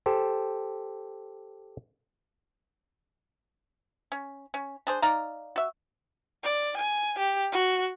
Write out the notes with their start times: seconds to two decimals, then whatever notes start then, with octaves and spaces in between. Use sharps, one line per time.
0.06 G4 A4 C5
4.12 C#4
4.54 C#4
4.87 D4 G#4 C5
5.02 D#4 D5 F5 A#5
5.56 F#4 E5
6.44 D5
6.77 G#5
7.19 G4
7.53 F#4